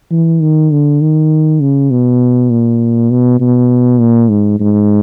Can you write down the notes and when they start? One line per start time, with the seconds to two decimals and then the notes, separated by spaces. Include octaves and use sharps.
0.11 E3
0.42 D#3
0.71 D3
1.01 D#3
1.61 C#3
1.91 B2
2.50 A#2
3.11 B2
3.40 B2
4.00 A#2
4.30 G#2
4.60 G#2